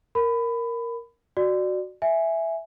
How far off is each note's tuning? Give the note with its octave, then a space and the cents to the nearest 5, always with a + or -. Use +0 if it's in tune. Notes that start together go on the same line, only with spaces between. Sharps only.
A#4 +0 B5 +20
F#4 +0 D5 +20
E5 +0 G#5 +0